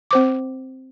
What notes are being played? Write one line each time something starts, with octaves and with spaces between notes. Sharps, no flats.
C4 C5 D6